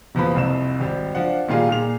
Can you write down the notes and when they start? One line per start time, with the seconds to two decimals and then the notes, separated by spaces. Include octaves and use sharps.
0.15 D#1 E2 F3 B3 B5
0.35 C2 F2 E7
0.80 G#1 G3 G4
1.15 F3 D4 F#5
1.48 A#2 D#3 G3 F4 G#4
1.69 A#2 G#4 F7